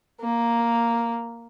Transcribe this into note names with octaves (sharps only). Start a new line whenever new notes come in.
A#3